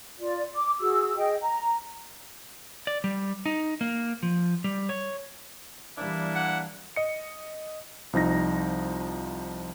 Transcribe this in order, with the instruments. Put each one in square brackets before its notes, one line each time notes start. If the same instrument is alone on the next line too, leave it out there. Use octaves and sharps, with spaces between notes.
[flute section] F4 D5
D6
F#4 G#4 E6
G#4 D#5 G5
A#5
[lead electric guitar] D5
G3
D#4
A#3
F3
G3
C#5
[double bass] E3 G3 [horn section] A#3 D4 E4
[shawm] F#5
[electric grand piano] D#5 C#7
C2 F3 D#4 A#6